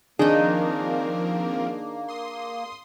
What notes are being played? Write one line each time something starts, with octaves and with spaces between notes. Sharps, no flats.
D#3 F3 A#3 C4 D4 D#4 G#4 A#4
C6 D#6